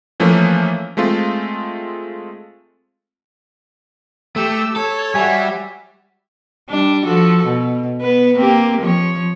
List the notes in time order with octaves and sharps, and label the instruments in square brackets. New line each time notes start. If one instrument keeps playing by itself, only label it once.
[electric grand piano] E3 F3 A3 A#3 C#4
G#3 A3 C4 F4
[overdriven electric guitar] A3 [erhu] G4 [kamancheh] E6
[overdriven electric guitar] A4 [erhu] C#5
[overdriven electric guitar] G3 [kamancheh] F#4 E5 [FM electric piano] G#5
[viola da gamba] G3 D4
F3 F#4 A4
B2
B3 B4
A#3 C4 G4
F3 C#5